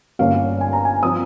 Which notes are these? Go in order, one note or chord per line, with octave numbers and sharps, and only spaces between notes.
G1 G2 G3 A#3 C#4 F5
G#5
A#5
G#5
F3 C4 D#6